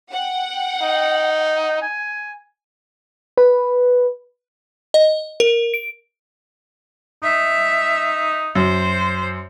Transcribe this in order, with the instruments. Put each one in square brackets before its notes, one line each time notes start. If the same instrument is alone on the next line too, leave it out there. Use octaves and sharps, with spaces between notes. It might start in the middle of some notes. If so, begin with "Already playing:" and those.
[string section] F#5 G5
[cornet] D#4
G#5
[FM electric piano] B4
[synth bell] D#5
A#4
D7
[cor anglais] D#4 [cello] E5
[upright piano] F#2 [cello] C5